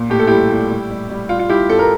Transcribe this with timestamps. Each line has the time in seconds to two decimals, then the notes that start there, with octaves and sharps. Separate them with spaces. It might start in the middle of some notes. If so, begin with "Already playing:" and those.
Already playing: A#2
0.10 A2 G4
0.19 A4
0.27 G3 E4 G4
0.50 A2
0.70 G3
0.90 G3
1.10 G3
1.29 G3 F4
1.39 F4
1.49 G3 E4 G4
1.69 G2 A4
1.79 A#4